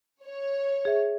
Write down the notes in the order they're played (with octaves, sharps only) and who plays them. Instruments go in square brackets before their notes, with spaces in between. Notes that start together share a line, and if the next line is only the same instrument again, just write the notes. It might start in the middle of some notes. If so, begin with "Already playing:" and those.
[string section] C#5
[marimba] G#4 E5